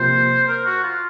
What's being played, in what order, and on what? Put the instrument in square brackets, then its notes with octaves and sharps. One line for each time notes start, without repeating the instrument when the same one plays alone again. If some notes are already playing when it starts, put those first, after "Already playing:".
Already playing: [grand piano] C3 F3 A#3 [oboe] C5
[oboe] A#4
F#4
F4